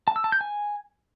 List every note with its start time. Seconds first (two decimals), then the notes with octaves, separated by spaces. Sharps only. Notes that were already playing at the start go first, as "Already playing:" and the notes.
0.08 A5
0.16 E6
0.24 A5
0.32 G6
0.41 G#5